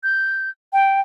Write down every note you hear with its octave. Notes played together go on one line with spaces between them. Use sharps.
G6
G5